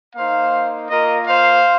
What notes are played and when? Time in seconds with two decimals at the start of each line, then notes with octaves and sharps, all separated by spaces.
0.16 A#3 D#4 C5 F5
0.90 A#3 F4 A#4 D#5
1.26 C5 F5